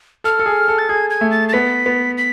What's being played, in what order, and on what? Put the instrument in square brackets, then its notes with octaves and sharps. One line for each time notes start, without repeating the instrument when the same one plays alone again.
[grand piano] A4 [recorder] F6
[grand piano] A4
G#4
A4
[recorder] A6
[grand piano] G#4 [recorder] G#6
[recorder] G#6
[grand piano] A3
[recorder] A6
A6
[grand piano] B3 [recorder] B6
[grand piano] B3
[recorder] B6